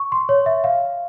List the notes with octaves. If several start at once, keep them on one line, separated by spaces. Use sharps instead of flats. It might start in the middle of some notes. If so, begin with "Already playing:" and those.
Already playing: C#6
C6
C#5
E5
F5